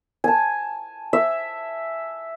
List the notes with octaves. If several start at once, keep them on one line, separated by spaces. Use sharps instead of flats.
G#5 A5
E5